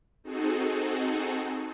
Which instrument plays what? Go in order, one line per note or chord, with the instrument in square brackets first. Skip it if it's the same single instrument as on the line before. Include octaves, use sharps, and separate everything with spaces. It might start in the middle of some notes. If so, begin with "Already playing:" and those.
[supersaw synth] C4 D#4 F#4 G#4 A4